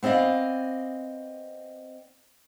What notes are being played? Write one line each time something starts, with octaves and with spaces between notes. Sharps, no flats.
B3 C4 D5 D#5 F5